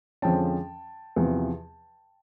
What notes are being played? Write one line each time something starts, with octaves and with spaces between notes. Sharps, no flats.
F2 D3 F3 G#3 C#4 G5 A5
E2 C3 F3